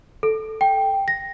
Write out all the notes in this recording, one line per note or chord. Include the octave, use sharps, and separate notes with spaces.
A4
G5
A#6